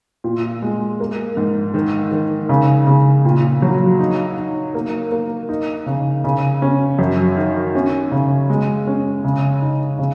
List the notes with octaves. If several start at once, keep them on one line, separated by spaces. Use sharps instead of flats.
A#2
G#3
A#3
G#2
D#3
D#3
C#3
C#3
A#2
F#3
D#4
D#4
A#3
A#3
D#4
C#3
C#3
C#4
F#2
D#3
C#4
C#3
G#3
C#4
C#3
D#4
C#3